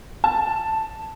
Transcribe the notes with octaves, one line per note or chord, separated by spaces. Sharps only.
A5